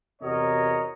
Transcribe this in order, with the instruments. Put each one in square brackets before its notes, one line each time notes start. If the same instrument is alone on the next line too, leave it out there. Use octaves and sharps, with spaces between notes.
[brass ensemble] E2 C3 F#4 A#4 C#5 D#5